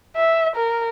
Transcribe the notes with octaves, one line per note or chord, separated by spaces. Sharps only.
E5
A#4